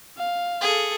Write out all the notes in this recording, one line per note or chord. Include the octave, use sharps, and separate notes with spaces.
F5
G#4 A4